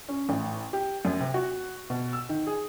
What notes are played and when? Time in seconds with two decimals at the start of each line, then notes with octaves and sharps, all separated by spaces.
0.08 C#4
0.29 A1
0.73 G4
1.05 F#2
1.20 C3
1.34 F#4
1.90 B2
2.13 E6
2.29 D#3
2.47 G#4